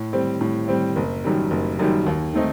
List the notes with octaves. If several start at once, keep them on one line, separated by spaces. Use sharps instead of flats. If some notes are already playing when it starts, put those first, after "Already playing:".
Already playing: A2
G3 C4
A2
G3 C4
F#1
F#2 D#3 G3
F#1
F#2 D#3 G3
D#2
D#3 A3 C4 D#4